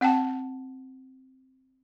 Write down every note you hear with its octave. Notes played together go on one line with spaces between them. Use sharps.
C4 F#5 G5 A5